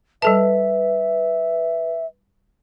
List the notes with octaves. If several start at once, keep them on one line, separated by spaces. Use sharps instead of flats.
G3 A4 B4 E5 A5